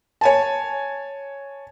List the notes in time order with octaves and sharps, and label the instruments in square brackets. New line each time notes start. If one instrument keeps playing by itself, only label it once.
[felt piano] C#5 G#5 A5